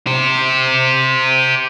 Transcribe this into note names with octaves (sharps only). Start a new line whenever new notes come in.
G4 C5